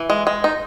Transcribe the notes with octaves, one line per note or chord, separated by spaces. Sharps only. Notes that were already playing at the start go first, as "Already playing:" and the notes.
Already playing: E3
G#3
G#3
D#4